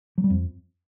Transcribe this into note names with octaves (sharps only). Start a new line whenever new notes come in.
F#3
G3
F2